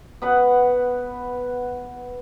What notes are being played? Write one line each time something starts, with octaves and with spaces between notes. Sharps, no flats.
B3 B4 F#5